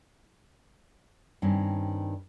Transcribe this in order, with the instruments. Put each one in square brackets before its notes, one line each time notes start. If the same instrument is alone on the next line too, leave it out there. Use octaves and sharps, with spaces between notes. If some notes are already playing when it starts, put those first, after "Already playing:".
[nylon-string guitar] G2 D#3 C4 C#4